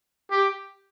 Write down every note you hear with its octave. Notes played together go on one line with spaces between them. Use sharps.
G4